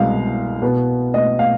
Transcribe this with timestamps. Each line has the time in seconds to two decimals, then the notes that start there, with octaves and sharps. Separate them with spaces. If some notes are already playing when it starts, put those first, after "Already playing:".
Already playing: C2 B2 G#3 C4 F5
0.62 B2 B3
1.14 D#5
1.39 F5